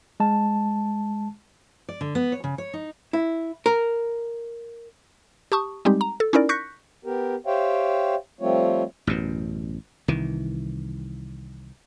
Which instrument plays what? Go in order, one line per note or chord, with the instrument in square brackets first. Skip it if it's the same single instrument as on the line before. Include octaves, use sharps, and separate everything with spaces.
[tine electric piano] G#3 A5
[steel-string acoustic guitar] D5
D3
B3
C#5
C#3
C#5
D#4
[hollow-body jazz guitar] E4
A#4
[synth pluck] G4 A5 C#6 D#6
G3 G#3 C4 D#4 G4
A#5
A4
C#4 D#4 E4 A#4 D5
C#6 F#6 G6 A#6 B6 C#7
[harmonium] B3 G4 A#4
G4 C5 C#5 E5 F5 G5
F3 G3 A3 C4 F4 C#5
[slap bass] A1 F#2 B2
C2 D#3 E3